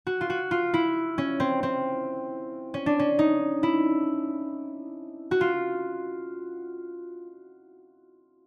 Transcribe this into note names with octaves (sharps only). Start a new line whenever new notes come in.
F#4
F4
F#4
F4
E4
C#4
C4
C4
C#4
D4
C#4
D#4
E4
F#4
F4